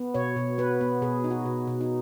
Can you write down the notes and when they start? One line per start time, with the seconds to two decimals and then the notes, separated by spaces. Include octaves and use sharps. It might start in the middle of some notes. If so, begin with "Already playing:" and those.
Already playing: B3
0.14 B2 C#5
0.36 B2
0.58 B3 B4
0.81 B3
1.02 B2 G#4
1.24 D#4
1.30 F#4
1.46 B2
1.67 B2
1.81 D#4